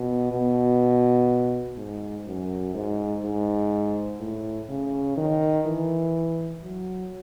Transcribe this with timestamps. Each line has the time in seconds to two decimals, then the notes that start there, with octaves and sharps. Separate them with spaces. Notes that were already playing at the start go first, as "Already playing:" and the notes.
Already playing: B2
0.31 B2
1.77 G#2
2.26 F#2
2.74 G#2
3.24 G#2
4.20 A2
4.69 C#3
5.17 D#3
5.66 E3
6.63 F#3